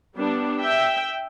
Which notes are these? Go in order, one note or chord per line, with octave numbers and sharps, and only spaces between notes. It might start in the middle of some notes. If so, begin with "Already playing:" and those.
G3 B3 D4
E5 G5